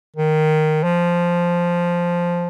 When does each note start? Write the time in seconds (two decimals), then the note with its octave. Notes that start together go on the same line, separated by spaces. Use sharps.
0.16 D#3
0.84 F3